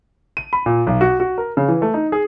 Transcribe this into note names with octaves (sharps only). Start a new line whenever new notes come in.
D#7
B5
A#2
B1
F#4
F#4
A#4
C#3
E3
A3
D#4
G#4